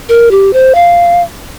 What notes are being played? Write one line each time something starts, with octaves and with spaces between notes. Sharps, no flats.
A#4
G4
C5
F5